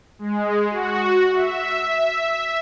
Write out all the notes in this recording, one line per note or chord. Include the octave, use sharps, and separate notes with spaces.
G#3
F#4
E5